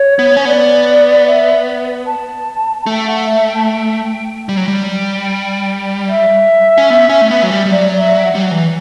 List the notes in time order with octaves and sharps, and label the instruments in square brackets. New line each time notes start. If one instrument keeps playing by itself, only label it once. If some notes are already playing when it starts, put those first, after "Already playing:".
Already playing: [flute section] C#5
[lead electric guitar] B3
C#4
[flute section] C#5
[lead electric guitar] B3 [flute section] D5
[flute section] E5
A5
[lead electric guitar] A3 [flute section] G5
[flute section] F#5
E5
G5
A5
G5
[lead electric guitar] G3 [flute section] G5
[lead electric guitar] F#3
G3
[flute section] E5
[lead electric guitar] C#4
B3
C#4
A3
B3
F#3
G3
G3
[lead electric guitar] F#3 [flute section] D5
[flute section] D5
E5
G5
F#5
[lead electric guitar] G3
F#3
E3